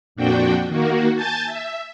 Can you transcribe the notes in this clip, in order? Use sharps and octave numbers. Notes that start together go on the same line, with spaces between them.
F2 A#2 D4 F#4 G5
D#3 A#3 F#4
G#5 A5 G6 A6
E5